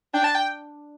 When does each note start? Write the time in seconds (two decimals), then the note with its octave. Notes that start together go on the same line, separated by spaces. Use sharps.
0.14 D4 G5
0.24 A5
0.35 G5